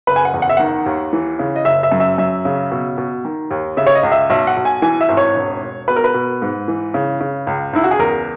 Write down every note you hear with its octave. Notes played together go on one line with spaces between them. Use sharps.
F#1 B4
G#5
F#5
E2
F#5
E5
D#3 F#5
D#2
E3
C#3
D#5
F#1 E5
E5
F#2
E5
F#2 E5
C#3
B2
B2
D#3
D#2
C#3 E5
C#5
D#5
C#2
E5
B1 E5
F#5
B1
G#5
E3 G#5
E5
G#1
C#5
E1
E1
B2 B4
A#4
B4
B2
G#2
E3
C#3
C#3
C#2
C#2 E4
F#4
G#4
E2 A#4